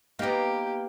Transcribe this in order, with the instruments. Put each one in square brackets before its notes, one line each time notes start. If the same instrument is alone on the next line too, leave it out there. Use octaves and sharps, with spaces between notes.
[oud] A#3 B3 [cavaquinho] D#4 A#5 [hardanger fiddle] G4